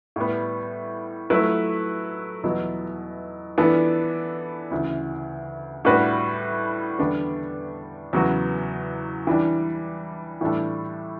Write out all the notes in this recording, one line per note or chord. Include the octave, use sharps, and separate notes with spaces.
A2 G3 B3
F#3 A3 E4 B4
E2 B2 F#3 B3 E4
E3 B3 D4 A4 D5
D2 C#3 E3
A2 G3 D4 F#4 B4
E2 D3 G3 B3 D4
E2 C#3 F#3 B3 F#4
E3 G3 D4
A2 E3 G3 D4 A4